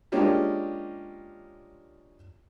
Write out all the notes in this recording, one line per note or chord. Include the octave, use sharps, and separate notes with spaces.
G#3 A#3 C#4 D4 F4 G4